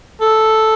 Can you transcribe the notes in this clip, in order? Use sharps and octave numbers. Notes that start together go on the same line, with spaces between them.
A4